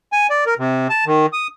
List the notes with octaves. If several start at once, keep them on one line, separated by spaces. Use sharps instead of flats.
G#5
D5
A#4
C3
A5
D#3
D#6